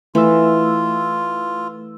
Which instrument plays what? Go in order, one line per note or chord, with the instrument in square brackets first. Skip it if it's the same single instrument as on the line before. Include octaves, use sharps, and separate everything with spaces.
[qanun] E3 [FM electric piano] A3 E6 [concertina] F4